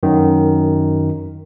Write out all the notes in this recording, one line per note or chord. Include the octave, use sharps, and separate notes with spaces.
F#2 D#3